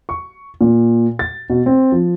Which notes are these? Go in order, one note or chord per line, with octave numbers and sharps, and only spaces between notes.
C#6
A#2
A6
B2
C4
F3